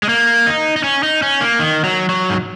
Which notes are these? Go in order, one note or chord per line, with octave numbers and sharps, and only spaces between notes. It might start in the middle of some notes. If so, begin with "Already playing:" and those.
G#3
A#3
D#4
D#4
C#4
D#4
C#4
A#3
D#3
F#3
F#3
G#2